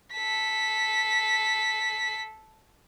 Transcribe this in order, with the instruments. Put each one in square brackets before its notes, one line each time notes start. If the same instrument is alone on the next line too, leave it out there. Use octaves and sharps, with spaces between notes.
[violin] A4 B6